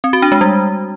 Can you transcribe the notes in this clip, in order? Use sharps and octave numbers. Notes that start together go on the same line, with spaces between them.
C4
F#4
D4
G#3
G3